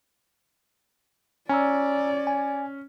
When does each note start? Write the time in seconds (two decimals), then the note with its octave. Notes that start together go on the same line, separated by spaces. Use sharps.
1.49 C#4 D5 G#5 A#5 E6
2.27 G#5